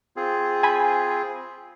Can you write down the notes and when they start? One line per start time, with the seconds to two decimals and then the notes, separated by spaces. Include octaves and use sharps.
0.16 C4 F4 G#4
0.63 G#5 B5